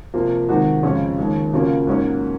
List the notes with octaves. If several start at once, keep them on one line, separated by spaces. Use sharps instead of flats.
C3 F3 A#3 F4
C3 D#3 G#3 D#4 F#4
F2 C#3 G#3 C#4 F4
D#2 D#3 G#3
C#3 F#3 A#3 C#4 F4
G#2 F#3 A#3 C#4